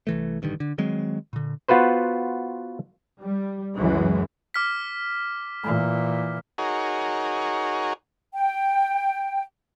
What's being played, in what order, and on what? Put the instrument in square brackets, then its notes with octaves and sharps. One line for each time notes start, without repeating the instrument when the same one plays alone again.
[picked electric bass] C2 E3 A3
A1 G2 D3 D#3
D3
D#3 F#3 G#3 C4
A#2 D3
[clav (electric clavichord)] B3 F4 F#4 B4 C5
[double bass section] G3
C#2 F#2 E3 G#3
[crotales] D6 F6 B6
[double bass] A#2 E3
[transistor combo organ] D#4 F#4 G#4 A#4 C#5
[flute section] G5